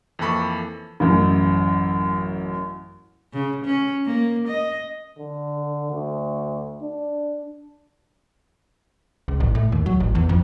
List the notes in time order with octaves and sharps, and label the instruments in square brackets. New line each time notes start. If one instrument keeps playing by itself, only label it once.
[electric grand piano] F2 E3 A#3 A4 B5 C#6
[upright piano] A1 F#2
[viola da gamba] C#3
C#4
A#3
D#5
[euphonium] D3
D2
D4
[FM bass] C#2
A1
A2
D#2
F#3
A1
E2
F2